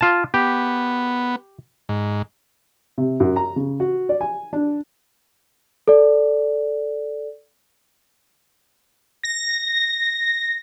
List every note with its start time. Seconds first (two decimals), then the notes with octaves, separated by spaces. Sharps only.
0.01 F4 A5
0.34 B3 G4
1.89 G#2
2.98 C3
3.20 F#2
3.36 A#5
3.56 C#3
3.80 F#4
4.09 D5
4.21 G#5
4.53 D4
5.88 A4 D5
9.24 A#6